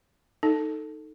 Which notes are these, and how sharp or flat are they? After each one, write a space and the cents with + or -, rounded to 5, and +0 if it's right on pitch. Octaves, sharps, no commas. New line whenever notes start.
D#4 +0 A4 +10